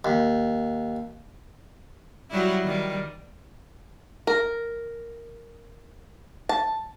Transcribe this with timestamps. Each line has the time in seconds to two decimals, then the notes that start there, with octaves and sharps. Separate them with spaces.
0.05 D#2
2.30 F#3 G3 E4
2.64 D#3 G3
4.27 A#4
6.49 A5